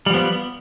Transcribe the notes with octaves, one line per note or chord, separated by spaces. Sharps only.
F3 G3 B3